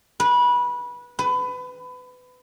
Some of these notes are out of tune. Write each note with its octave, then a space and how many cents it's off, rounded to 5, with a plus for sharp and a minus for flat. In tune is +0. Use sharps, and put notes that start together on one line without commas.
B4 -20
B4 +25